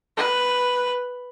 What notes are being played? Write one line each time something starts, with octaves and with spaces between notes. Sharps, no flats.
B4